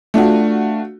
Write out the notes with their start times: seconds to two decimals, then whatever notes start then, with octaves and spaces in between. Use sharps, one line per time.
0.14 A3 D4 F4 F#4